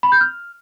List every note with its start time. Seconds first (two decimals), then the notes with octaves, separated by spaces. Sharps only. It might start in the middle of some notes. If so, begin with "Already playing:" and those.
0.03 B5
0.12 G6
0.21 F6